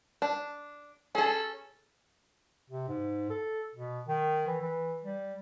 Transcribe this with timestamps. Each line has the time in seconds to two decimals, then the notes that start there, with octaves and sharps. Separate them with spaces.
0.22 D4
1.15 C#4 G#4 A4
2.70 C3
2.88 G#2
3.30 A4
3.75 B2
4.08 D#3
4.47 E3
4.61 E3
5.04 G3